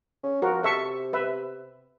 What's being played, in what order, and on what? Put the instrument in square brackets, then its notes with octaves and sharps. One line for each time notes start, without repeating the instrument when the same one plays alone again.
[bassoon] C#4
[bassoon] F3 [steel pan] F#4 A#4
[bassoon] C3 [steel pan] A4 E5 C#6
[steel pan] B4 E5